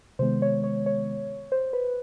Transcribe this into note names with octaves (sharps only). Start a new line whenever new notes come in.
C3 D#3 G#3 B3 C5
C#5
C#5
C#5
C5
B4